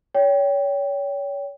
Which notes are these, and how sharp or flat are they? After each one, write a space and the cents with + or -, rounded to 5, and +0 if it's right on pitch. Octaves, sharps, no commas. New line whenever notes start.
C#5 +30 G5 +0